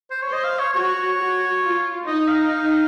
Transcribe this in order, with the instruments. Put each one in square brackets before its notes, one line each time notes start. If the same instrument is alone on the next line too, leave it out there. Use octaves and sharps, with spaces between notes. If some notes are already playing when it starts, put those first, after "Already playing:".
[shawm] C5
C#5
[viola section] C5 [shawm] D#5
[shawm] F5
C#5
[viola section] F#4 [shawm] C#5
[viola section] F#4
F4
[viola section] D#4 [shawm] D#5
[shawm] F5